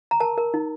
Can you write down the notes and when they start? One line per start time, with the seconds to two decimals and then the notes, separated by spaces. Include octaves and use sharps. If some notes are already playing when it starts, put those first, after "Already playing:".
0.11 A#5
0.20 A#4 A5
0.38 A#4
0.54 D#4